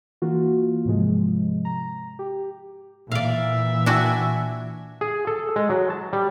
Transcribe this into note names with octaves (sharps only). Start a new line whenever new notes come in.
E3 A#3 F4 F#4
G#2 C3 F3 G#3
A#5
G4
A#2 E3 D5 E5 F5
D4 E4 F#4 D5 G5 G#5
G#4
A4
G#3
F#3
A5
G3